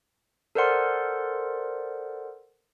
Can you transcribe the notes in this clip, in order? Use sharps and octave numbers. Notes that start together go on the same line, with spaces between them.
A4 A#4 C5 D5 F#5 C6